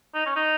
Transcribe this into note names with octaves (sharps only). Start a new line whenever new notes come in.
D#4
C#4
D#4